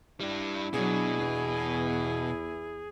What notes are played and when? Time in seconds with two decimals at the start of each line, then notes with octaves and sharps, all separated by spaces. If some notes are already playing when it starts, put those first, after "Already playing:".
0.20 G3 D4 E4
0.73 B2 F#3 D4 G#4
1.20 E2